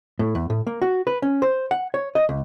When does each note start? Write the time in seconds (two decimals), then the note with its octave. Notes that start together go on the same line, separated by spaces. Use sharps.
0.19 A2
0.35 E2
0.50 A2
0.67 A#3
0.82 F#4
1.07 B4
1.22 C#4
1.42 C5
1.71 F#5
1.94 C#5
2.15 D#5
2.29 C#2